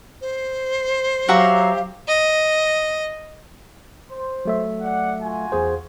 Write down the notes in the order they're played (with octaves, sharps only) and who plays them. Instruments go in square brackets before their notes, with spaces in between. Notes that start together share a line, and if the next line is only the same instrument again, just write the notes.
[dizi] C5
[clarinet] F#3 [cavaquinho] F#4 E5 A#5 [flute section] G4 F5
[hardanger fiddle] D#5
[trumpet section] C5
[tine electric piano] F#3 A3 E5
[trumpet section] D5 F#5
F4 F#4 G#5
[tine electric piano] E2 G#4 C5